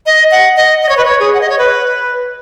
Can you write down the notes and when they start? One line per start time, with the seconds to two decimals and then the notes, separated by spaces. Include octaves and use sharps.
0.06 D#5
0.31 F#5
0.57 D#5
0.83 D#5
0.89 C#5
0.97 B4
1.05 C#5
1.20 G#4
1.33 F#5
1.41 D#5
1.50 C#5
1.59 B4